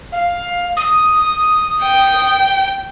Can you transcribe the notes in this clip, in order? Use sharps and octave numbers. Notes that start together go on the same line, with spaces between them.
F5
D#6
G5